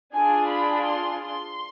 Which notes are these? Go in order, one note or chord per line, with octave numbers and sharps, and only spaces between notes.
D4 F4 G#4 G#5
B5
C6
C6